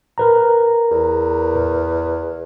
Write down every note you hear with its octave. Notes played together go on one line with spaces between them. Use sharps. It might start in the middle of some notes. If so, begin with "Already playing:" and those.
A#4 B4 A#5
E2